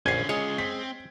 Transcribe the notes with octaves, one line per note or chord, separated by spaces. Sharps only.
A#1 D3 C#4 G#5 G#6 C7
G#3 C#4 F4 C#5
C4 B6